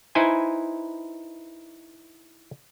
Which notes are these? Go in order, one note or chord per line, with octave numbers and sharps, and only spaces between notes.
D#4 E4 B4 C5 G#5